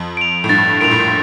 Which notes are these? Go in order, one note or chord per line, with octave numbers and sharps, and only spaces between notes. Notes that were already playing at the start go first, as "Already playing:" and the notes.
Already playing: F2
D7 F7
A2
G2 A6
A#2 D7 F7
A2